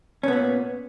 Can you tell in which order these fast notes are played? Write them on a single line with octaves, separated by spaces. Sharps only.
C#4 B3 A#2